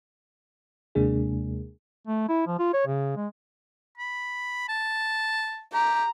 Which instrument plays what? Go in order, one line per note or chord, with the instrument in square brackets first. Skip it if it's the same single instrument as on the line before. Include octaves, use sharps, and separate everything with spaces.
[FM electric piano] D#2 C3 G#3 A#3 D4 G#4
[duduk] A3
E4
F3
F4
C#5
C#3
G#3
[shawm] B5
A5
[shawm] G4 [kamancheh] A#5